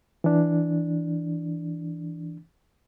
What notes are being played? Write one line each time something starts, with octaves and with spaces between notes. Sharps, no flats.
E3 D4